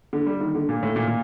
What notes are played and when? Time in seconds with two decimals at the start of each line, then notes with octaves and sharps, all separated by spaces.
0.13 D3
0.26 G3
0.40 D#3
0.55 D3
0.69 A#2
0.83 A2
0.96 A#2
1.07 A#2